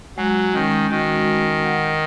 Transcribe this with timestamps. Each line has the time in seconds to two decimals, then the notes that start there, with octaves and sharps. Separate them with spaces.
0.17 F#3 G#3
0.54 D#3 C#4
0.90 D#3 F#4
1.26 G#3
1.63 F#5